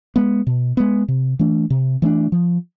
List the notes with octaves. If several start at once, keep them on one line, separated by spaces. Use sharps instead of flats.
G#3 B3
B2
G#3 B3
C3
E3 A3 D4
C3
E3 A3 D4
F3